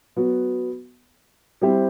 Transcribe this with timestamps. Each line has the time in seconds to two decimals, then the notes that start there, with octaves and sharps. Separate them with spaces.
0.16 F#3 B3 F#4
1.62 G3 C4 E4 G4 C5